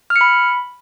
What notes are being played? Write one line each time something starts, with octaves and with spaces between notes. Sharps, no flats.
F6
C#7
B5